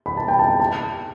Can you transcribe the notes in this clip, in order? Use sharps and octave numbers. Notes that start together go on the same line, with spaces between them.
B5
A5
G5
A5
A5